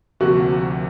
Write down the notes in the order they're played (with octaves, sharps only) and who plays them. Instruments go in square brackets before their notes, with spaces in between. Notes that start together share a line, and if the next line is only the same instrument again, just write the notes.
[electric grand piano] D2 C3 F3 A#3 [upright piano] F#4